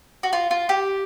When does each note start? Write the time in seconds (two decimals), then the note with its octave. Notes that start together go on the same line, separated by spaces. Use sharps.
0.23 F#4
0.33 F4
0.51 F4
0.69 G4